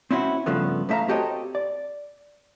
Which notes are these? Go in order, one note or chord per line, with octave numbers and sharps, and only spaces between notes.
C4 C#4 E4 F#4
G2 C#3 F3 A3 B3
A2 A3 E5 F5 A#5
C4 F#4 G4 A4 C#5 D#5
D5